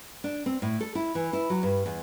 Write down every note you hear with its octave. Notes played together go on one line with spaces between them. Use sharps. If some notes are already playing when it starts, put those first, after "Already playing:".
D4
C4
A2
A4
E4
E3
E4
F#3
G2
E2